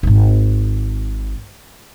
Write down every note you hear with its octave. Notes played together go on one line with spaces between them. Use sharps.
D#1 G#1